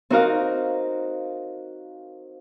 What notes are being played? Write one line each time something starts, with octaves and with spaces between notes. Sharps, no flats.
C4 D#4 F#4 A#4 F5